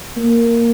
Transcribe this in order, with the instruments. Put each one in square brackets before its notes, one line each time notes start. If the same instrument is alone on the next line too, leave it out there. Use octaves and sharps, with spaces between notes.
[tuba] A#3